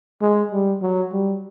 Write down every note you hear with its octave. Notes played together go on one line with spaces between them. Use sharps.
G#3
G3
F#3
G3